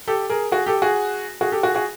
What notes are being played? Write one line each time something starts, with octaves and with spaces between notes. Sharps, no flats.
G4 A4
G#4 A#4
F#4 G#4
G4 A4
F#4 G#4
F#4 G#4
G4 A4
F#4 G#4
F#4 G#4